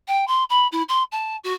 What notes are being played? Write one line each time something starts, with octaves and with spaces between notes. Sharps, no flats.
G5
C6
B5
E4
C6
A5
F#4